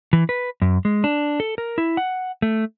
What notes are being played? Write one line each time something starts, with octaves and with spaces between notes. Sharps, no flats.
E3
B4
F#2
G#3
D4
A4
A#4
E4
F#5
A3